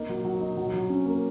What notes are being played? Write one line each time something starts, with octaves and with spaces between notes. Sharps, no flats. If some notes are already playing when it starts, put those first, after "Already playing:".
Already playing: A#3 D#4
F#3
F#3
D#4
F#3
F#3
C#4
A#3